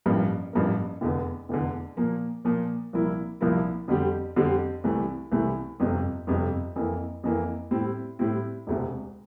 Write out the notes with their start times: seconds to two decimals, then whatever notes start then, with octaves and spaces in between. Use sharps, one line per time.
0.06 A1 G2 F3 A#3
0.53 A1 G2 F3 A#3
1.01 F1 E2 D3
1.49 F1 E2 D3
1.97 A#2 F3 A#3
2.45 A#2 F3 A#3
2.93 C2 A#2 F3 A#3 E4
3.41 C2 A#2 F3 A#3 E4
3.88 F2 D3 G3 C4 G4
4.36 F2 D3 G3 C4 G4
4.84 C2 C3 E3 A3
5.32 C2 C3 E3 A3
5.80 G1 F2 C3
6.27 G1 F2 C3
6.76 F2 E3 A#3
7.24 F2 E3 A#3
7.71 A2 G3 C4 E4
8.19 A2 G3 C4 E4
8.67 E1 D2 C3